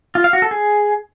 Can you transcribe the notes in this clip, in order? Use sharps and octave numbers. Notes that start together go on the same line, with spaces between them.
F4
F5
F#4
A4
G#4